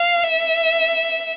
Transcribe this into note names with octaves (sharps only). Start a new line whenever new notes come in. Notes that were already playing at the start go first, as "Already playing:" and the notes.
Already playing: F5
E5